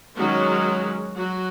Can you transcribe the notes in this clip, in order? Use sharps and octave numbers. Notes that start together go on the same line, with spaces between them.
D#3 F#3 G#3 C#4 F#4
F#3 F#4